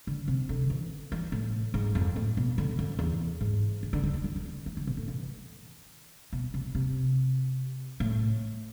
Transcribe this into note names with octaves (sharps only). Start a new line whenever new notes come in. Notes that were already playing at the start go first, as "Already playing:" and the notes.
D3
C3
D3
E3
E3
A2
G#2
F2
A2
B2
D3
F2
E2
G#2
D3
D3
D3
D3
E3
E3
D3
E3
D3
B2
A2
E3
B2
C3
C3
A2